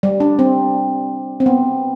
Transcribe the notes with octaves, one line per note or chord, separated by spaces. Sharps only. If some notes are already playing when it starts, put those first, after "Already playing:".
G3
D4
C4
C4
B3